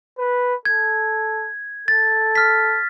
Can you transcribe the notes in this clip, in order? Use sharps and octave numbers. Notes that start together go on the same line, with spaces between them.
B4
A4 G#6
A4 A6
F6 B6